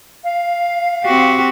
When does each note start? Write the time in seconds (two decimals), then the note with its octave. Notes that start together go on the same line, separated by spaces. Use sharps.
0.23 F5
1.04 C4 F#4 G4